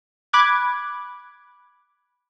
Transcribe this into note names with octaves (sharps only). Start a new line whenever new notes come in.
B5 D6 F#6 G#6